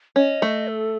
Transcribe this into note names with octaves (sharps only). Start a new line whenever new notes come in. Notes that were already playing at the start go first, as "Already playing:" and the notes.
C#4 D#5
A3
A4